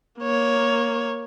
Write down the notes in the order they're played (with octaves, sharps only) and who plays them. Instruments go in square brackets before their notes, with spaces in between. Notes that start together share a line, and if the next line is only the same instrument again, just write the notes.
[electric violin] A#3 C#5